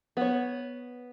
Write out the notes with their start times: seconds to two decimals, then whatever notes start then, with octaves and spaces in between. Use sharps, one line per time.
0.17 B3 C#5